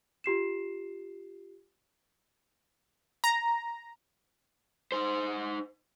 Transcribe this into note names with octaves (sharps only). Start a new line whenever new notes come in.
F4 G4 C7 E7
A#5
D#4 C5